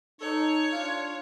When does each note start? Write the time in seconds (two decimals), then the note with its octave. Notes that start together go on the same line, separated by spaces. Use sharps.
0.21 D#4 A4 C#5
0.73 D4 F4